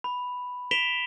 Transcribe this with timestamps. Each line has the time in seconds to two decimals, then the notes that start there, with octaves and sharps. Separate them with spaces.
0.04 B5
0.71 B6 D7 E7 F7 G7